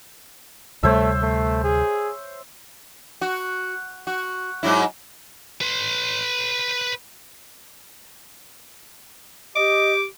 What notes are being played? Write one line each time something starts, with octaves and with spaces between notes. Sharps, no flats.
D2 C3 G3 A3 C5 C#5 E5
A3
G#4
F#4
F#4
G#2 F#3 E4
B4 C6
G4 D#5 D6